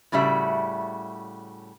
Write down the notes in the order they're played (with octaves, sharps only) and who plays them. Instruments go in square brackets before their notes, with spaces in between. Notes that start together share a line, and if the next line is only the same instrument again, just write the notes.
[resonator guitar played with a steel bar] A2 C#3 G3 F#4 E5